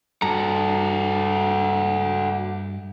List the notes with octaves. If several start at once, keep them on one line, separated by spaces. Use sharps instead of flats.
G2 F#4 A4 A#5